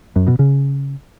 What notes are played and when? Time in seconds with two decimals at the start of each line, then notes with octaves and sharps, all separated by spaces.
0.16 F#2
0.27 B2
0.39 C#3